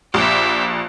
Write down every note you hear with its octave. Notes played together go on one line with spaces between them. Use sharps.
A#1 G4 E5